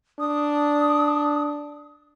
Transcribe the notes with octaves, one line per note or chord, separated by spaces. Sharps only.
D4 D#6